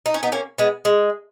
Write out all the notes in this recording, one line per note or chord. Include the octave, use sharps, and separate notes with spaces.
D#4
C#4
B3 D#4
A#3 C#4
G#3 B3
G#3